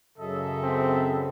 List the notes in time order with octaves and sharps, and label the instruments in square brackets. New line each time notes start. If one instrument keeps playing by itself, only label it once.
[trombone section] F#2 C#3 [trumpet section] A4 D#5 E5
[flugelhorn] C4